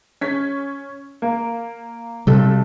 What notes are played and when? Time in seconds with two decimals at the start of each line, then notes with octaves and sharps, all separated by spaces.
0.21 C#4 B6
1.22 A#3
2.27 B1 C3 G3 A4